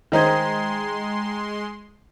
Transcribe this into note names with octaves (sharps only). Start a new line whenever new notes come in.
D#3 G#3 D#4 C5 G5 A#5 C6 G#6